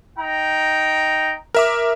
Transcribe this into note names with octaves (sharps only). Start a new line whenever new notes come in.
D#4 G5 A#5
A#4 E5 D6